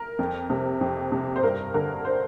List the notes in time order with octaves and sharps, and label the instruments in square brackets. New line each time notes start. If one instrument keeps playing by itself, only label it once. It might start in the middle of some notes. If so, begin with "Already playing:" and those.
Already playing: [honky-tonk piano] A#4
F2
C3
F2
C3
C5
G2 A#4
D3 A#4
C5